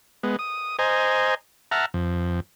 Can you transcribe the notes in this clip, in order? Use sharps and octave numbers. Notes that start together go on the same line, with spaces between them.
G#3 B3
D#6
C5 D#5 G#5 A#5
E5 F#5 A5 A#5 F6
F2